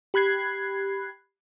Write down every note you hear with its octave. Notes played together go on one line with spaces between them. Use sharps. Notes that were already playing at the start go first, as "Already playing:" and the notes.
G4 B5 F#6 G#6 C7